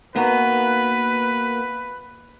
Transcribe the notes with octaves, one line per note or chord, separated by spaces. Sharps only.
A#3 B3 D#4 F#4 B4